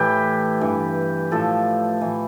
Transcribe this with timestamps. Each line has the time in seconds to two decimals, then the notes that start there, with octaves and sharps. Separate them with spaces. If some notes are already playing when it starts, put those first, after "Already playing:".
Already playing: A2 E3 G4 A4 B4
0.61 G2 E3
1.31 A2 F3 A4
2.01 A2 E3